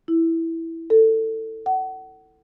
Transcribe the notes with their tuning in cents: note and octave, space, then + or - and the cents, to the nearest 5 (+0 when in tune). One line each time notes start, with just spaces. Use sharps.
E4 -5
A4 +20
F#5 +30